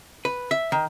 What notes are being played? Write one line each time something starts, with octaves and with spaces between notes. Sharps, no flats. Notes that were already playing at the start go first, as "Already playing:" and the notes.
B4
E5
D#3